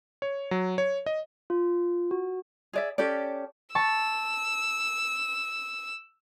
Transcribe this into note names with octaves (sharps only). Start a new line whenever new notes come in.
C#5
F#3
C#5
D#5
F4
F#4
G#4 D5 E5
C#4 G4 A4 D5
A5 C#6 E6